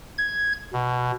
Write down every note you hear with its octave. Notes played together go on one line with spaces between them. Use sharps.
G#6
B2